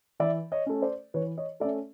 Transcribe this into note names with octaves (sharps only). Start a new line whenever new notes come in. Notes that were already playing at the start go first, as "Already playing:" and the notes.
E3 D5 E5
C#5 D#5
A3 C#4
C5 D5
E3 B4 C#5
C#5 D#5
A3 C#4 D5 E5